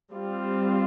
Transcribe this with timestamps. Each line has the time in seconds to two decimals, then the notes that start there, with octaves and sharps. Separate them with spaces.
0.12 G3 C4 F4